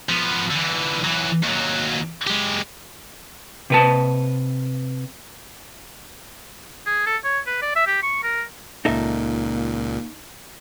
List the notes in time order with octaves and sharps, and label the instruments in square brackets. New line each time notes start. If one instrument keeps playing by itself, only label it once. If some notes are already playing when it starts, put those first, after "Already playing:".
[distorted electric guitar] F3 B3
D3 E3
E3 F#3
D#2 F#3
G#3 G4
[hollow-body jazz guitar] C3 B4 A5
[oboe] G#4
A4
C#5
B4
D5
E5
G4
C#6
A#4
[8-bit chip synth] C#2 A#2 [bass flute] A#3 [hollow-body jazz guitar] D#4 A4 E5